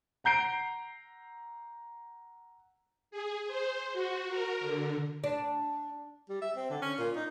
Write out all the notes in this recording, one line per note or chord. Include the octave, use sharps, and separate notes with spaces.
F#5 A#5 G6 C7 D7
G#4
C5
F#4
A#4
D3
D4
G3
E5
C4
D3
C#4
A#2
D#4